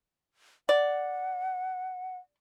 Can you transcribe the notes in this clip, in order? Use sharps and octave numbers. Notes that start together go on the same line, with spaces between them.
D5 F#5